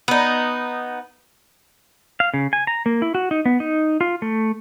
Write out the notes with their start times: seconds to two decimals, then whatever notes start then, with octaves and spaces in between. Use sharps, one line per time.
0.08 B3 D#4
2.20 F5
2.34 C#3
2.53 G#5
2.67 A#5
2.86 A#3
3.02 E4
3.15 F#4
3.31 D#4
3.46 B3
3.60 D#4
4.01 F4
4.22 A3